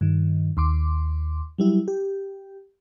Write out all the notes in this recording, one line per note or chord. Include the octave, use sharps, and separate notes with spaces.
G2 D#3
D#2 C6 D6
F#3 G3 E4
G4